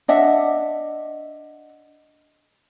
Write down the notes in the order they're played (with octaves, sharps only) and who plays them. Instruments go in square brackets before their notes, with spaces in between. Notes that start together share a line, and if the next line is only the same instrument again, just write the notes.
[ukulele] D4 D#5 E5 F#5